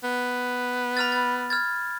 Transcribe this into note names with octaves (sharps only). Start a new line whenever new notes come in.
B3
B5 F6 A6
A6
F6 G#6 A6